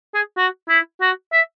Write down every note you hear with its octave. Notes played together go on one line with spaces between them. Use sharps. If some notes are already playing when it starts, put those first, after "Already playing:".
G#4
F#4
E4
F#4
E5